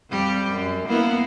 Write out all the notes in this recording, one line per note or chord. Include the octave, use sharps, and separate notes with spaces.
F2 G3 G4
F#2
A#3 B3 E4